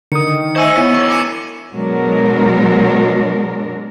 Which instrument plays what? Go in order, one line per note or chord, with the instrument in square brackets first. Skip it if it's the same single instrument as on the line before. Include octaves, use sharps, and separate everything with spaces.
[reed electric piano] D3 D#6 [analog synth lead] D#3 [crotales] C#7
[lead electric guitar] C5 G#5 [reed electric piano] D#5 E5 [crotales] C#6 E6 D#7
[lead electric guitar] B3 [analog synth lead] E4 [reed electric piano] C#5
[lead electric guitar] B2 E3 [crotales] C#6
[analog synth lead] G#5 [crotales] D6 C#7 E7
[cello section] B2 F#3 G#3 D4 A#4